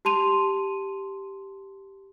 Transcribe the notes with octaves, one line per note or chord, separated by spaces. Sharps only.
G4 A5 C6 D#7 F7